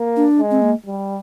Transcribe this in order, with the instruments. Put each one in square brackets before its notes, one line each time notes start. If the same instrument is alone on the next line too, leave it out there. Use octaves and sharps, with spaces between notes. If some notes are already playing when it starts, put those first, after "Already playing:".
Already playing: [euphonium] A#3
[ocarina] D4
[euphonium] G#3
[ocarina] C4
A#3
[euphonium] G3